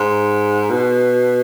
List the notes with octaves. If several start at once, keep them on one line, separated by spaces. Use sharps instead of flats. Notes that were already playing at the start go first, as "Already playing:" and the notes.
Already playing: G#2
B2